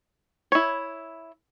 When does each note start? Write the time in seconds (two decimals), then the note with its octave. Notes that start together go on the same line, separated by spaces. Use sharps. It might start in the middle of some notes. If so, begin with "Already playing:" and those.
0.52 E4 C#5